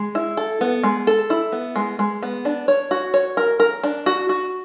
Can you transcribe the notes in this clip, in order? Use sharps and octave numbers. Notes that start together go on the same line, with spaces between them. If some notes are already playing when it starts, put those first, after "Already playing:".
Already playing: G#3
E4
A4
B3
G#3
A4
E4
B3
G#3
G#3
B3
D4
C#5
F#4
C#5
A#4
A#4
D4
F#4
F#4